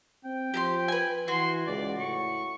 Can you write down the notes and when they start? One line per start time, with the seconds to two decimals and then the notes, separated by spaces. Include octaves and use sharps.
0.24 C4 G5
0.54 F3 G4 A#5 C6
0.88 B4 G#5
1.28 E3 F#4 C6
1.66 C#2 D5
1.99 A2 C#6